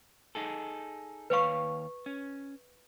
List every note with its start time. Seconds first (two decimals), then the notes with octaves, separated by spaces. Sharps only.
0.35 D#4 G#4 A4
1.30 D#2 B4 C#5 F5 C#6
2.06 C#4